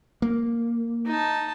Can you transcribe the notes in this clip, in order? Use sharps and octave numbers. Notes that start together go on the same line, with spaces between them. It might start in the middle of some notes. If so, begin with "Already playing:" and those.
A#3
D#4 A5